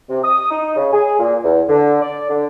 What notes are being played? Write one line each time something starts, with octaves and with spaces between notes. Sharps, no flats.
C3
D#6
D#4
C#3
G#4
A#2
E2
D3
D5
D3